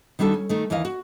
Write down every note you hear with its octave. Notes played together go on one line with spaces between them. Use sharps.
D#3 G3 D4 F#4 A4
C#4
D#3 A3 D#4
D#2 E3 E4 D#5 F5
F#4